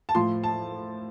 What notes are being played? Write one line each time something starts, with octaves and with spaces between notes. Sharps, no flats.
A5
A2 F3 C6
A5